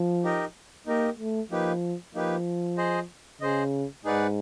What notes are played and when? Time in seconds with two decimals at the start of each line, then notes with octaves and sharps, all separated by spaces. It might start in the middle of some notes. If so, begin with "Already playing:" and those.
Already playing: F3
0.24 D#4 G4 A#4 D#5
0.86 A#3 D#4 G4 A#4 D#5
1.19 A3
1.50 F3 A#3 D#4 G4 B4
2.14 F3 A#3 D#4 G4 B4
2.77 G#4 C5 D#5
3.41 C#3 G#4 C5 D#5
4.05 G#2 D#4 G#4 B4 D5 F#5